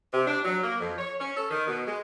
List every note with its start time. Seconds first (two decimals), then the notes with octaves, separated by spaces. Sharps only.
0.12 C3
0.26 D4
0.44 F#3
0.63 A#3
0.79 F2
0.98 C#5
1.20 C#4
1.36 A4
1.50 D#3
1.67 B2
1.86 G#3